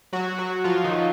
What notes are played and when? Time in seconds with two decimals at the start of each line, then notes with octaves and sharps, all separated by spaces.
0.13 F#3 F#4
0.39 F#3 F#4
0.64 F3 F4
0.84 D#3 D#4